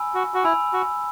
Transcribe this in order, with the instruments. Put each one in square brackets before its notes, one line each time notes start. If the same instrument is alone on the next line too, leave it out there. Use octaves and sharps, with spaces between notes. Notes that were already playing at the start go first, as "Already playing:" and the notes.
Already playing: [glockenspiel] G#5 B5 E6
[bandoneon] F#4
F#4
[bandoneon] E4 [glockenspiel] G#5 B5 E6
[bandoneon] F#4